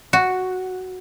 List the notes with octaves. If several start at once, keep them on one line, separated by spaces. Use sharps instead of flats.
F#4